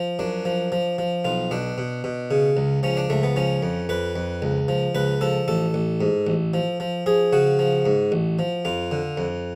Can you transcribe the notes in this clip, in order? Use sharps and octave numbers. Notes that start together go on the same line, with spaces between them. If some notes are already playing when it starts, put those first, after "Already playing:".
Already playing: F3
F#2 D4
F3
F3
F3
B1 F4
B2 D4
B2
B2
C#3
C#2
F3 C#4
D4
C#2 A3
B3
F3 C#4
F2
F2 B4
F2
C#2
F3
C#2 B4
F3 A4
A1 A4
A1
G#2
A1
F3
F3
F3 G#4
C#3 F#4
F3
G#2
A1
F3
F2 F4
D3
F2